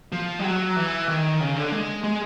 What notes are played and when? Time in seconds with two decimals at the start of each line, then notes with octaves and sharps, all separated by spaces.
0.12 F3
0.39 G3
0.44 F#3
0.76 E3
1.08 D#3
1.40 C#3
1.56 D3
1.72 G#3
2.04 G#3